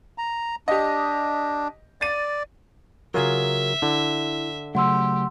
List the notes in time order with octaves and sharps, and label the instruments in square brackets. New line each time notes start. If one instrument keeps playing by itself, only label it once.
[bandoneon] A#5
[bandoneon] D4 [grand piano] G4 D#5
[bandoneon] D5 [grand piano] A6 D#7
[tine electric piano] C#3 A#4 [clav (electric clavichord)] F#3 F4 G#4 [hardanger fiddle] E5
[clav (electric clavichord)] D3 [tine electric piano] E4
[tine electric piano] C#3 F#3 A3 [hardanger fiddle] G4 [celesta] F#5 C6 E6